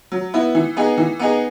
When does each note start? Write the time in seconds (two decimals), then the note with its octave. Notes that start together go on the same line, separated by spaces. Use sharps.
0.12 F#3
0.34 B3 E4
0.55 E3
0.77 B3 D#4 G#4
0.98 E3
1.19 B3 D#4 G#4